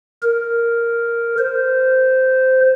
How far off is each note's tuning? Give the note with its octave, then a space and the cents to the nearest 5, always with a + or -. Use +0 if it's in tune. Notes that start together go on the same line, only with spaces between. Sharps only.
A#4 +0
C5 -10